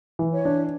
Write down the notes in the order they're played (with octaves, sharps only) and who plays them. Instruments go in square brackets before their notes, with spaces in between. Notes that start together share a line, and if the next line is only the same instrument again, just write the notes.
[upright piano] E3
[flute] C#5
[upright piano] D4